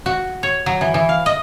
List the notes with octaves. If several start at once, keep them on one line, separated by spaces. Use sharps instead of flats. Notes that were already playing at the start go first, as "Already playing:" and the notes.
F#4
C#5
F#3
E3
E3
F5
D#5